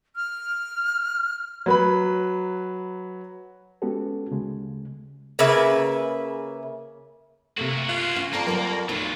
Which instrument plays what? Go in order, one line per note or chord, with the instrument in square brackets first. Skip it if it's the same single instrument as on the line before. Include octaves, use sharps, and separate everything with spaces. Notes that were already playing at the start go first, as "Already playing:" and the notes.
[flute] F6
[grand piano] F#3 B4 B5
[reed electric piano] G#3 B3 C#4 F#4 G4 A4
D2 C#3 G#3
[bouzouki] C#3 A#3 B4 E5
[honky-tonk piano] C3 A3 [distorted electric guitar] A#3 F#4
[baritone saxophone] F4 [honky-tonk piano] F#6
[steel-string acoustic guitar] C#4 [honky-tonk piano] F5
[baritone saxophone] F2 [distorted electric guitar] A#3 [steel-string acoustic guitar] D5 A5 A#5
[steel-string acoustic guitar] F#3 G3 B3 [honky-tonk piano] A4 A#4 D5
[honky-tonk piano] B1 [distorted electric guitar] F#3 F4 [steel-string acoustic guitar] E4